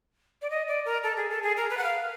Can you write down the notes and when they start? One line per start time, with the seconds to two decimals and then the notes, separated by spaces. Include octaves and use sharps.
0.42 D5
0.50 D#5
0.68 D5
0.85 A#4
1.03 A4
1.17 G#4
1.30 A4
1.43 G#4
1.57 A#4
1.70 B4
1.78 F#5
1.84 F5